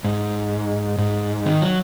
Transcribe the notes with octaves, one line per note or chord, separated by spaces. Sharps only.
G#2
G#2
D#3
F#3